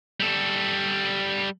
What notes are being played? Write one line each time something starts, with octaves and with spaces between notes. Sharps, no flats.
G3 A4